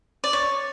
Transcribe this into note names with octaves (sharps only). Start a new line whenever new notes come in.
D5
C#5